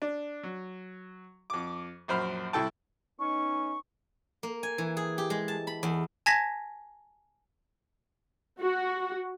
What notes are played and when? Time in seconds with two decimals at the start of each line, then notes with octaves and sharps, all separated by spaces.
0.02 D4
0.43 F#3
1.50 F2 D6
2.08 A#1 F#2 C5 B5 F6
2.53 C2 E4 A4 G5 A5
3.19 B3 C#4 D#4 C#6
4.43 A#3
4.63 G#5
4.78 E3
4.97 G#4
5.18 G4
5.30 G#3
5.48 A5
5.67 B5
5.83 E2
6.26 G#5 A5 G#6 A#6 B6
8.61 F#4